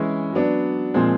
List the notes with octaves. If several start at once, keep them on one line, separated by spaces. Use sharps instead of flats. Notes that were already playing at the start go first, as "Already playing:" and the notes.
Already playing: E3 G#3 C#4 E4
F#3 B3 D4
A#2 F3 G#3 C4